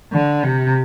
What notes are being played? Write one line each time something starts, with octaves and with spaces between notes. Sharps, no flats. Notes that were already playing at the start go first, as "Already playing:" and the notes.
D3
C3